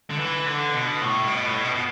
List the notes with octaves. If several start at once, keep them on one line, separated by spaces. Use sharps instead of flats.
D3
E3
D3
B2
A2
B2
A2
B2
B2